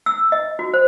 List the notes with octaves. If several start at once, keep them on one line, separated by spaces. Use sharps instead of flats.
E6
D#5
F#4
C5